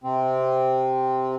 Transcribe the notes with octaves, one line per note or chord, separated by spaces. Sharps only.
C3 C4